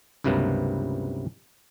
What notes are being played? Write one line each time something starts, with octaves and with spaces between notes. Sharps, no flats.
C#2 G2 C3 F#3 A#3 B3